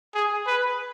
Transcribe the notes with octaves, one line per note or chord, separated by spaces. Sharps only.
G#4
B4